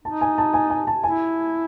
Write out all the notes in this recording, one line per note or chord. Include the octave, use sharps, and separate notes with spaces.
D#4 A5
G#5
A5
G#5
G#5
A5
E4 G#5